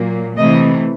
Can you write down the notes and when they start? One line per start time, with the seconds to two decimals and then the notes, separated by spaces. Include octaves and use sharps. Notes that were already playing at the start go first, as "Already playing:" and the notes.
Already playing: A#2 F#3 A#3
0.37 C3 E3 A3 D#5